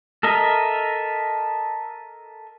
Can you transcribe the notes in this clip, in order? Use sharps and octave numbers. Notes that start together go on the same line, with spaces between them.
A4 A#4 D#5 E5